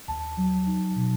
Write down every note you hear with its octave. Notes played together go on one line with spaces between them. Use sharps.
D#2 A5
F#3
D#4
B2